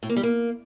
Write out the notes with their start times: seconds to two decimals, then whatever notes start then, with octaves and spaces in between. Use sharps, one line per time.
0.03 A2
0.10 A#3
0.17 G3
0.23 A#3